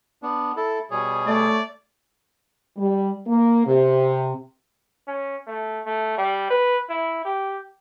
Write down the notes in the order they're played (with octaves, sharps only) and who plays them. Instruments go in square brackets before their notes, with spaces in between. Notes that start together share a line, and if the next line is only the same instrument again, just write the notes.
[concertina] B3 D4
E4 A4
[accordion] B2 G3 G#4 [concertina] C#5
[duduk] A3 [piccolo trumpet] D5
[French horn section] G3
A#3
C3
[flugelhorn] C#4
A3
A3
G3
B4
E4
G4